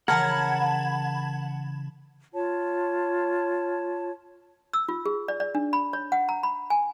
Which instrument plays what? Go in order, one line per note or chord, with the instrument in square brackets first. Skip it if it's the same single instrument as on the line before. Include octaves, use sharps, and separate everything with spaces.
[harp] C#3 E3 [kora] A#4 [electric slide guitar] F#5 [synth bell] A5 B5 G#6
[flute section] F4 C#5 A5
[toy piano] E6
F4
G#4
D5
D5
D4
B5
C#5
F#5
A#5
B5
G#5